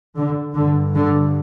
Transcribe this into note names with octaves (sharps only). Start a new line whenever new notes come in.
D3
G2 D3
D3